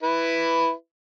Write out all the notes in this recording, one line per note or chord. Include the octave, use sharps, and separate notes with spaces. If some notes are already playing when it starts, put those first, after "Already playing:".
E4 B4